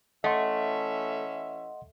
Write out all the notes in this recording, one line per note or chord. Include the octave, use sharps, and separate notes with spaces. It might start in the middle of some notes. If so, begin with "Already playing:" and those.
E3 A3 C#4 D#5 E5 F#5 C6